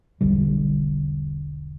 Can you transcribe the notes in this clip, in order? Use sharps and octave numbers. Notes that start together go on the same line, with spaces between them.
E1 B1 D3 G3